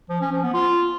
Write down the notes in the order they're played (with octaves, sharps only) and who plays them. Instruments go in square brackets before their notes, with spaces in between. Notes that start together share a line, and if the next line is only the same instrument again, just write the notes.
[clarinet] F3
C#4
F3
B3
F4